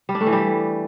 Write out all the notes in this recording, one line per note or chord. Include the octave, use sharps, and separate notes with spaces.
G3
D4
A3
E3
G3